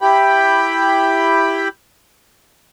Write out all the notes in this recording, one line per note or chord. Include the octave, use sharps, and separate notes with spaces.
E4 G4 G5 B5